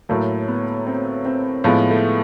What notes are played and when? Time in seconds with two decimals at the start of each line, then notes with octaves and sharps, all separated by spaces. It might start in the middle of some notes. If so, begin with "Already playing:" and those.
0.09 A2 F#3 A3 A#3
0.48 B3
0.87 C4
1.25 C4
1.64 A2 F3 G#3 B3
1.91 A3